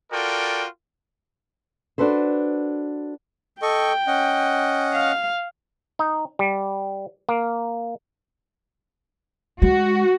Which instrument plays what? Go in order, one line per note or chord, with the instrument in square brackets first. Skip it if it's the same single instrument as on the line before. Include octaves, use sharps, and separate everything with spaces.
[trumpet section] F4 F#4 A4 A#4 D5 G5
[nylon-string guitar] D4 F#4 A4 B4 C5
[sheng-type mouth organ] A4 D#5 C#6 [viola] G5
[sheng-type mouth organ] C#4 D#5 F#5
[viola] F5
[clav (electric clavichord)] D#4
G3
A#3
[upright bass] G#3 [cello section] F#4